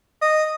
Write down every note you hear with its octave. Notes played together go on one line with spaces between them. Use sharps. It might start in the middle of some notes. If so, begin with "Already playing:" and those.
D#5